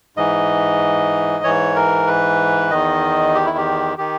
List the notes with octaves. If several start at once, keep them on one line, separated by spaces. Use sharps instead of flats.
G#2 E3 D#5
G#2 E3 C#5
A#4
B4
E2 D#3 D#5
G4
E4
G4
D#3 G4